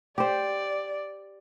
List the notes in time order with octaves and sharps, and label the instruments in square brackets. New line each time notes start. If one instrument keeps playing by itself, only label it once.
[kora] G4 C5 [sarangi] D5